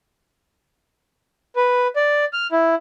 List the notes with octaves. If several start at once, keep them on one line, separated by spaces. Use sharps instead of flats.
B4
D5
F6
E4